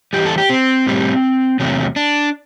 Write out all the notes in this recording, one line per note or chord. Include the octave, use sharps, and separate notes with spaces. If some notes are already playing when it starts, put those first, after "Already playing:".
E2 C3 E3 G3 G4
A4
G4
C4
A2 G3
E2 C3 F#3 A3
D4